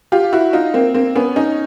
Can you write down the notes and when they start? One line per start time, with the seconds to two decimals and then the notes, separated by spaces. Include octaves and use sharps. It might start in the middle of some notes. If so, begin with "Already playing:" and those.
0.12 F4 G4
0.33 E4 F#4
0.53 D#4 F4
0.74 A#3 C4
0.94 A#3 C4
1.16 B3 C#4
1.36 C#4 D#4